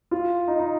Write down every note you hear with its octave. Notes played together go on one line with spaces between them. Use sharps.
F4
D#4
D#4